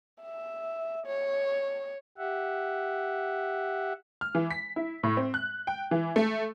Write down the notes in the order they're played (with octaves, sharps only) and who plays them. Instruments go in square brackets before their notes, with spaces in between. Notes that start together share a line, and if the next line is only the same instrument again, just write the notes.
[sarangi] E5
C#5
[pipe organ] G4 E5 F#5
[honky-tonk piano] F6
E3
B6
E4
A2
C4
F#6
G5
E3
A3